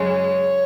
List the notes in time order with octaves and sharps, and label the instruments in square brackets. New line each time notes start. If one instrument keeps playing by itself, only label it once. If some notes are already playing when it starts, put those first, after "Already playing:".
Already playing: [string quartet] F#2 C#3 G#3 C#5